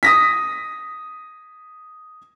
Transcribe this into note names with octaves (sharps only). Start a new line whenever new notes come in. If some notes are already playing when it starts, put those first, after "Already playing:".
D#6 A#6 B6